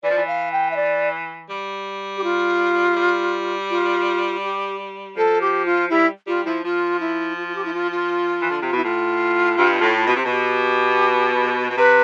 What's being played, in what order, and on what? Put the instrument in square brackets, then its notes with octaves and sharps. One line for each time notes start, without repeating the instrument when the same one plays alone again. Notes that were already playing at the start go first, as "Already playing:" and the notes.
[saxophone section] E3 [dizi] D5
[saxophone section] F3
E3
[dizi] F5
G5
E5
D5
[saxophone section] G3
[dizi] G4
F4
[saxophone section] G3
[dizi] F4
G4
[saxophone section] F3 [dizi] A4
[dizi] G4
F4
[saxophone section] G3 [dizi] E4
[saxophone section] G3 [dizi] F4
[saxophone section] F3 [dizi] E4
[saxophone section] F3 [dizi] F4
[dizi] E4
F4
F4
G4
E4
F4
F4
[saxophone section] E3
D3
C3
[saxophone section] B2 [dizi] E4
[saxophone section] A2 [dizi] F4
[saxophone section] G2
B2
A2
B2
C3
[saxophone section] B2 [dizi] G4
[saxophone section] B2
[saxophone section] C3 [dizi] B4